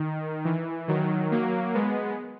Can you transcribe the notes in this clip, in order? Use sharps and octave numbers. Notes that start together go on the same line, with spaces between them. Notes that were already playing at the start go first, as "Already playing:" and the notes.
Already playing: D#3
E3
D#3 F#3
F#3 A#3
G#3 B3